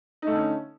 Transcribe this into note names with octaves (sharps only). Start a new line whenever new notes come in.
D3 A3 C#4 D#4